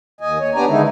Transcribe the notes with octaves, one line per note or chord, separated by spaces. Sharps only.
D#2 D#5 G#5
C#5
B3 D4 G4 D5 G#5 A#5
D3 D#3 G#3 D#4 E4